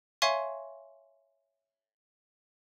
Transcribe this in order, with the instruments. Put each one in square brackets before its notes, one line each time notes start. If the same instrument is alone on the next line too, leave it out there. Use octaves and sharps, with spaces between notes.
[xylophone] C#5 E5 F5 G#5 C6 C#6